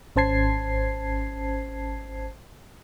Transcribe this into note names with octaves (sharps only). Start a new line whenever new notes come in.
G#1 C#4 C5 A5 G#6 C7